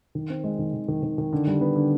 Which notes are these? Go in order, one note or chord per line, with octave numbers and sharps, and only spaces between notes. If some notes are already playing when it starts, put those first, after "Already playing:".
D#3
C4
G#3
D#3
D#3
D#3
D#3
D#3
D3
G3
B3
D3